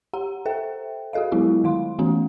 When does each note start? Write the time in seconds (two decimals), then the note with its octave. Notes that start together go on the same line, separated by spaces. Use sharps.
0.13 G4 F#5 A#5
0.46 A4 C5 E5 G5
1.13 F#4 G#4 A4 D#5 F5
1.32 F#3 G#3 B3 E4 F4 G4
1.64 D#3 F5 C6
1.99 E3 A3 B3 C#4 F#4